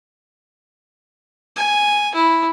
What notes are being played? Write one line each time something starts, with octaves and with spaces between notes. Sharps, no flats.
G#5
E4